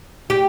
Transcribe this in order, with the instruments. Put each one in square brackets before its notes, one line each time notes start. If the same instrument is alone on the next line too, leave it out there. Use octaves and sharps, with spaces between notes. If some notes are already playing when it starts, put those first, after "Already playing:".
[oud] G4